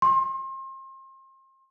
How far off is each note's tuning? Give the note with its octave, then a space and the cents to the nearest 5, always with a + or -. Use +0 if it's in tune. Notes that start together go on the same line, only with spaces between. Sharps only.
C6 +35